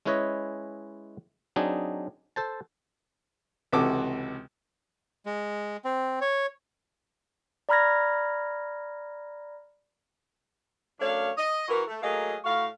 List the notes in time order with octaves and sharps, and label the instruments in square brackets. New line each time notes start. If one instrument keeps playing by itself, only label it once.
[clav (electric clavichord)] G#3 C#4 E4 B4 C#5 D#5
F#3 C4 D4 D#4 G#4
A4 C5 A5
[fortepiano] C#2 C3 E3 F#4 A4 D6
[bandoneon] G#3
C4
C#5
[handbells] D5 A#5 B5 F6 G#6 A#6
[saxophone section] F#2 A3 D4 C#5 F5
D#5
E3 F#4 A#4
A3
F#3 A3 A#3 G#4 D#5 F5
A2 A3 F#4 F5